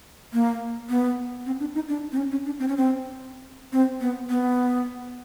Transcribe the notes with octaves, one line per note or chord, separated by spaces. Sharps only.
A#3
B3
C4
D4
D#4
D4
C4
C#4
C#4
D4
C4
C#4
C4
C4
B3
B3